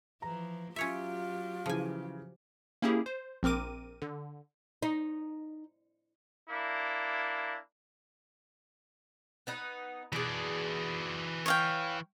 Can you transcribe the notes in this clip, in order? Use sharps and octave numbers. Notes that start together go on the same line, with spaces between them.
E3 F3 A#5
F#3 C#4 F4 G4 C#5 E5
C#3 E3 F3 G#5
A#3 C#4 E4 G4 G#4
C5
A#1 C4 A#4 D6 D#7
D3
D#4
A#3 D4 E4
B3 D#4 B4
B2 E3 G#4 D5
C#5 F5 G5